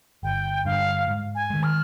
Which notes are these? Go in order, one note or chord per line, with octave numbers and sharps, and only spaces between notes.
G1 G5
G2 D3 F5
G#2
G#5
D#3 G#3
F6